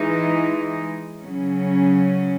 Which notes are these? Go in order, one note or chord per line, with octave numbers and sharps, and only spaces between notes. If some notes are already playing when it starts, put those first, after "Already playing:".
Already playing: E3 G#3 D#4
C#3 F#3 C#4